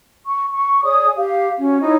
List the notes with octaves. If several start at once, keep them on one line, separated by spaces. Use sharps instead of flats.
C#6
C#6
G#4 C#5 D5 D#6
G4 F5
C#4 F#4
D#4 E4 C#5 D#5